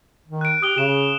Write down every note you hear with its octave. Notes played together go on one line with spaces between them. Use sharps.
D#3
F#6 D7
G4 D#6 F#6 G7
C#3 E7